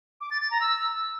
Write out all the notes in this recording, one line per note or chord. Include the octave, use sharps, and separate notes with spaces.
D6
A6
A6
A#5
E6